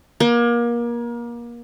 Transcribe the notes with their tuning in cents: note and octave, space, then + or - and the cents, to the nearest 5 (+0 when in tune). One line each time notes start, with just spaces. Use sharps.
A#3 +30